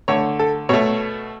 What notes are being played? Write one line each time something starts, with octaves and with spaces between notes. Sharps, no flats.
D3 A3 C#5
A4
B2 A3 C#5